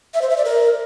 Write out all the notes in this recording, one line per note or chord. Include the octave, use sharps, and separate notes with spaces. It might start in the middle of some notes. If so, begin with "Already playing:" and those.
E5
C5
E5
D5
A#4